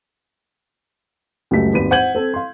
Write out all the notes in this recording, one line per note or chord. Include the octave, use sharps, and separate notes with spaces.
C#2 F#2 G3 A3 B6
G#1 D#2 B4 D#7
C5 F#5 G6 G#6 F#7
C4 A4
F5 C6